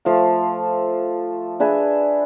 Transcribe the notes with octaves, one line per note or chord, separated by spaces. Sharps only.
F3 A3 F5
D4 G#4 B4 E5